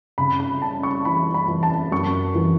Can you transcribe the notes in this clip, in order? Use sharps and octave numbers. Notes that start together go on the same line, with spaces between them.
C#3 B5
B5
C#4 A5
C#6
E3 B5
B5
E3
A5
F#2 C#6
E3